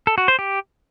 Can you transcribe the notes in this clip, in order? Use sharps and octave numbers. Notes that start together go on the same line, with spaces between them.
A4
F#4
C5
G4